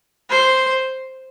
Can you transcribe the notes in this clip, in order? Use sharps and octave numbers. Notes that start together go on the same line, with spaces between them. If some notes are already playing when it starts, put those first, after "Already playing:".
C5